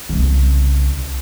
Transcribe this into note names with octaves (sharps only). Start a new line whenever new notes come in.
C2 C#3